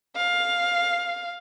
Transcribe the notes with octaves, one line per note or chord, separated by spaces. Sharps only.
F5